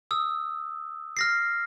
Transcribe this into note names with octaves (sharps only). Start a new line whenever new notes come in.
D#6 E6
F6 A#6 C7